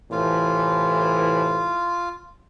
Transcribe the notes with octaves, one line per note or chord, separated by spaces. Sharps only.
A2 C3 E3 F4